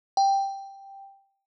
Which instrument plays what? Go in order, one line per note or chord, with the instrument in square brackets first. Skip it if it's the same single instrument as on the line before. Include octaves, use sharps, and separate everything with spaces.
[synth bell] G5